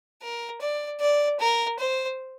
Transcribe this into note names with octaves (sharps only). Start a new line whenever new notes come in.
A#4
D5
D5
A#4
C5